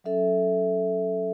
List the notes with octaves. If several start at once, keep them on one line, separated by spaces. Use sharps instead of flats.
F#3 C#4 A4 E5